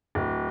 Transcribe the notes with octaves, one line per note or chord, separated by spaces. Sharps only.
D1